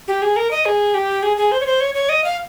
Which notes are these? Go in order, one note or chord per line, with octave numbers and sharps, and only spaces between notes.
G4
G#4
A#4
D#5
G#4
G4
G#4
G#4
C5
C#5
C5
C#5
C#5
D#5
F5